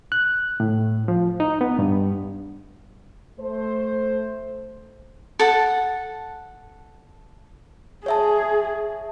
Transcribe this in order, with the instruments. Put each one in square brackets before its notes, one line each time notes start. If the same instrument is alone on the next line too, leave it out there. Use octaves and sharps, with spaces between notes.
[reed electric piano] F#6
A2
F3
D#4
B3
G2
[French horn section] A3 C5
[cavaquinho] A4 F#5 A5
[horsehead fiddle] G#4 [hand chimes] C#5 E5 A5